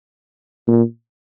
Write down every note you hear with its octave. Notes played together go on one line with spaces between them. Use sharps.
A#2